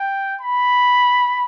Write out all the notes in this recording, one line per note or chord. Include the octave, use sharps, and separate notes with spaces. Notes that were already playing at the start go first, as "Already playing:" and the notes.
Already playing: G5
B5